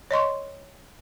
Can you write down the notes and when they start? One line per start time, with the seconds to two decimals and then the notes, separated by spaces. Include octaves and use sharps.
0.11 C#5 D#5 C6 C#6